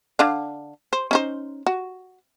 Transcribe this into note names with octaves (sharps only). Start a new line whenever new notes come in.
D3 D4 F5
C5
C#4 D#4 C5
F#4